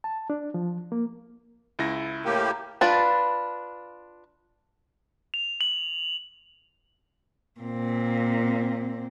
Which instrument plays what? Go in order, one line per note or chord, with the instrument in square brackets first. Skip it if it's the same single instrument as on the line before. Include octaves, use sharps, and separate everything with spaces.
[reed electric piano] A5
D4
F3
A#3
[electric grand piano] C#2 E4 A#6
[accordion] A2 A#3 G4
[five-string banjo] D4 F4 B4 A5
[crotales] F7
F#7
[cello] A#2 C4